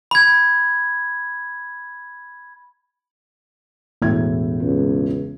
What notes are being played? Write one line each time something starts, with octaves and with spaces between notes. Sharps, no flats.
B5 G#6
E1 A2 G#6
C#2